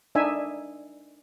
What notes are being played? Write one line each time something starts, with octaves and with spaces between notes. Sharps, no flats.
D4 D#4 E5 G#5